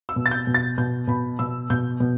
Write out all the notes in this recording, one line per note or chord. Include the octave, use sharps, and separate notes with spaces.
E6
B2
A6
G6
B2
A6
B2 G6
B2 B5
B2 E6
B2 G6
B2